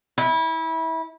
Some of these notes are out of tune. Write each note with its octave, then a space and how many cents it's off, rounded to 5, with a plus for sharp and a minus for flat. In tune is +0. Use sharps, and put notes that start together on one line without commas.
E4 -25